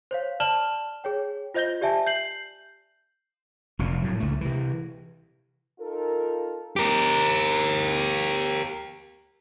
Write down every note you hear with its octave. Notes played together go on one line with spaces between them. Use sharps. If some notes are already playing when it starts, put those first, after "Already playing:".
C5 C#5 F5
D5 A5 F6 E7 F#7 G7
G#4 C#5 G5
F4 C5 D#5 G6 A#6 G7
G4 D5 E5 G#5 A5
G6 C7 F#7
F1 A#2
A2 F#3
C#2 A3
C3 E3
D#4 F4 A4 A#4
G4 A#4